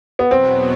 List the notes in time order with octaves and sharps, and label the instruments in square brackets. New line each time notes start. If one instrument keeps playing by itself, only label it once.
[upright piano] B3
[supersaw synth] E2 B2 F#3 B3 [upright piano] C4